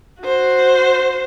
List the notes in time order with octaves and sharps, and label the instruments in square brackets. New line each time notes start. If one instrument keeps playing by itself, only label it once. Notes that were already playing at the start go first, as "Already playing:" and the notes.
[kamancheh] F#4 C5